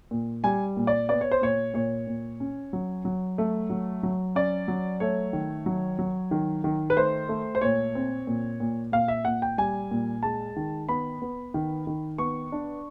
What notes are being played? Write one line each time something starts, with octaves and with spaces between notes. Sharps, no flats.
A#2
G3 G#5
A#2
D5
B3 D5
C#5
C5
A#2 C#5
A#2 C#5
A#2
C#4
F#3
F#3
A3
F#3
F#3
C#4 D5
F#3
A3 C#5
D#3
F#3
F#3
D#3
D#3
B4
A3 C5
A3
C5
A#2 C#5
C4
A#2
A#2
A#2 F5
E5
A#2 F#5
G5
G3 G#5
A#2
G#3 A5
D#3
B3 B5
B3
D#3
D#3
B3 C#6
D4